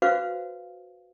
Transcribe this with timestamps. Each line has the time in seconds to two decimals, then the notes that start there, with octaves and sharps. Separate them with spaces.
0.02 F#4 B4 C5 F5